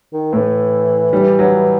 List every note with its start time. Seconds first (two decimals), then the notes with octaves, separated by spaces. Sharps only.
0.13 D#3
0.33 A2 E3 A3
1.13 G3
1.39 F#3